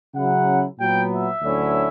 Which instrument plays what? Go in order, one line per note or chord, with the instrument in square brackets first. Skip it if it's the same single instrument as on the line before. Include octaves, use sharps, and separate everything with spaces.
[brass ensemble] C#3 F#3 C#4 E4 F#5
A#2 F#3 B3 G5
E5
D2 D3 F#3 C#4 E4